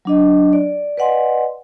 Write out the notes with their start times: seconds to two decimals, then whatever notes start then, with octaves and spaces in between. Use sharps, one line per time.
0.05 F#3 D4 D#5
0.53 D5
0.97 B4 D5 D#5 F#5 G#5 C6